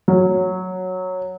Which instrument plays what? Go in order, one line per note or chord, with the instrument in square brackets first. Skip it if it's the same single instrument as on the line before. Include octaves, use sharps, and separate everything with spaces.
[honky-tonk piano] F#3